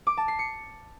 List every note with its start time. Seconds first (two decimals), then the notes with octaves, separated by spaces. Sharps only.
0.07 D6
0.17 A5
0.28 C7
0.39 C#7